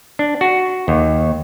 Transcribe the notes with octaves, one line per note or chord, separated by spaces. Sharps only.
D4
F#4
D#2